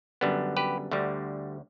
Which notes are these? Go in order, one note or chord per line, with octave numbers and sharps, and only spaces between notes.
F#2 D3 G3 B3
G4 B4
D2 D3 G3